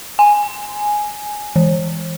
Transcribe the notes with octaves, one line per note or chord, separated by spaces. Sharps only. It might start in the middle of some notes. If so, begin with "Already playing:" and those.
G#5
E3